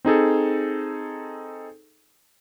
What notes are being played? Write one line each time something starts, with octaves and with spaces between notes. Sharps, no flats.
C4 D#4 G#4 A4